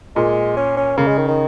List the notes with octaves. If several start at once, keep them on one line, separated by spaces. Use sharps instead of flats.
A#2 G#3
C#4
C#4
C#3 A#3
G#3
D#3
D#3